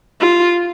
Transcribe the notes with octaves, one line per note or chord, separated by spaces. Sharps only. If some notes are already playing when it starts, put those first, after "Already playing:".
F4